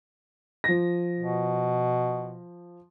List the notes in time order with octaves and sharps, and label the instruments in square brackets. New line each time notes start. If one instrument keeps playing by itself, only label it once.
[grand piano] F3 A#6
[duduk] B2